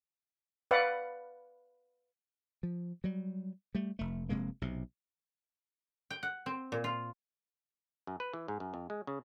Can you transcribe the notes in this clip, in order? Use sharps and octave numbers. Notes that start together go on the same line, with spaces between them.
B4 D5 F5 F#5
F3
F#3 G3
G3 A3
F1 A3
F1 C3 G#3 A#3
B1 C3
G5
F#5
C4
A#2
F4
F#2
B4
E3
G#2
F#2
F2
G#3
C#3